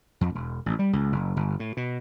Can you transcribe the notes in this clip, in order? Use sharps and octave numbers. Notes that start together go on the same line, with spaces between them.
F2
E1
A1
G3
C#2
F#1
G1
A2
B2